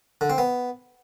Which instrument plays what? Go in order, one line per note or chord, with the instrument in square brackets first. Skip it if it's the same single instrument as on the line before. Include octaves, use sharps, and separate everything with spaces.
[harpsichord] D3
C4
B3